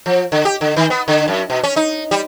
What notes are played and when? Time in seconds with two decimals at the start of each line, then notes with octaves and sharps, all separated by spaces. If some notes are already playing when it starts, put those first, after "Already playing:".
0.06 F3
0.32 D3
0.45 G4
0.61 D3
0.76 D#3
0.90 B3
1.08 D3
1.28 F#2
1.50 B2
1.63 C#4
1.76 D#4
2.11 G3